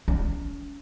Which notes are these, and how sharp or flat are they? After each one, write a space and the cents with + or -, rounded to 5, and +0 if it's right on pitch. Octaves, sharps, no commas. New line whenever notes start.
C#4 +40